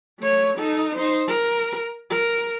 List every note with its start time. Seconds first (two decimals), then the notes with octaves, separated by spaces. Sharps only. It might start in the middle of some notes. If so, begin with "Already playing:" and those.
0.19 A3 C#5
0.57 D#4 A4
0.96 D#4 C5
1.28 A#4
2.10 A#4